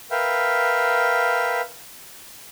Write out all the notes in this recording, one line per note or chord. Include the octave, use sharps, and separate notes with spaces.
A#4 B4 E5 F5 G5